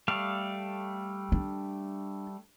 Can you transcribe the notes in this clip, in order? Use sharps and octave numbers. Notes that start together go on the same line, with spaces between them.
G3 A3 F5
D4